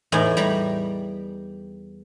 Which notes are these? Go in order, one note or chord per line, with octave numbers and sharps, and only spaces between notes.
E2 A2 D#4 D5 G#5 A#5
G3 A#5 B5